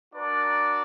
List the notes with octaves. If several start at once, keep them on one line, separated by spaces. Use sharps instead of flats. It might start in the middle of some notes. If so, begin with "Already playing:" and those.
D4 F#4 A#4 D5